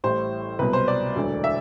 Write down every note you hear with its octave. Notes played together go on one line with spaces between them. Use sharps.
A1 A2 G3 C5
C2 B2 F#3 B4
C5
D5
E1 D2 D3 F#3
E5